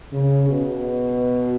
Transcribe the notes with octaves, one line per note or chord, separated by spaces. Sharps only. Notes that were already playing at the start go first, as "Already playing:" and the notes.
C#3
B2